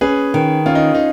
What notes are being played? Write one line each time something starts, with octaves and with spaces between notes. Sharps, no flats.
C#4 G#4 B4
D#3
C#4 F4
D#4
D#4